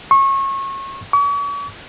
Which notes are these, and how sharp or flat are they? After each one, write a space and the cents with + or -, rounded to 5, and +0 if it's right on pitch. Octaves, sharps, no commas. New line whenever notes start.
C#6 -25
C#6 +45